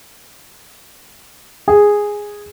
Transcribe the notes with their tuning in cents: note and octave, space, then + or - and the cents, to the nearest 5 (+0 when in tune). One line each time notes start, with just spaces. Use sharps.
G#4 -5